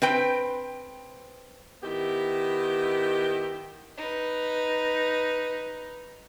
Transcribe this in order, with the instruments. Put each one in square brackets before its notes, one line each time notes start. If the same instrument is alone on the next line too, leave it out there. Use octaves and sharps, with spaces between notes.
[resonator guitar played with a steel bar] C4 B4 G5
[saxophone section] D#3 B3 E4 G4
[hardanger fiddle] D#4 B4